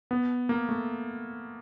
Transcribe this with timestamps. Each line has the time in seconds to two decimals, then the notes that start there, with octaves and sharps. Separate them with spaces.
0.11 B3
0.49 A#3
0.69 A3